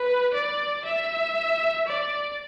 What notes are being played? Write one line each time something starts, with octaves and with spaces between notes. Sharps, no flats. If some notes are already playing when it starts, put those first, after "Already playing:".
Already playing: B4
D5
E5
D5